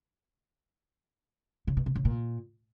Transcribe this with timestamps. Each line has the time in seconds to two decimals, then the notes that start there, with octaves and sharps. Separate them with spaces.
1.67 C#3
1.77 B2
1.86 C3
1.95 C#3
2.05 A#2